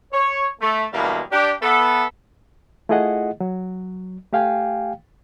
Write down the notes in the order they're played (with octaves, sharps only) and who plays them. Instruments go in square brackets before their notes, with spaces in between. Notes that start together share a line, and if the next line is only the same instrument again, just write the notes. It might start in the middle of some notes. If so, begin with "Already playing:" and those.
[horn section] C#5
A3
B2 D3 E3 G3 G#3 A#3
D4 G4
B3 A4 E5
[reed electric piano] A3 E4 F4 G#4 D#5 F#5
F#3
A3 G4 F5 G5 G#5